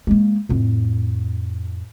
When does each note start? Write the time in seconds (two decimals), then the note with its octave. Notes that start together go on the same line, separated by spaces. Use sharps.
0.07 G#3 A#3
0.49 F2 A2